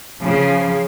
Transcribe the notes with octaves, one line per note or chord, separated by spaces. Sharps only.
C#3 F3